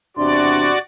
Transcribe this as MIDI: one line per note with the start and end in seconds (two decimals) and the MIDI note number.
0.17 0.72 40
0.17 0.72 48
0.17 0.72 62
0.17 0.78 66
0.17 0.78 74
0.17 0.74 84